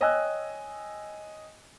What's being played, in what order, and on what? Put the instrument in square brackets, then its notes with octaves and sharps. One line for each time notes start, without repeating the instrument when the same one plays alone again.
[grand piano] C#5 D#5 G5 G#5 E6 F#6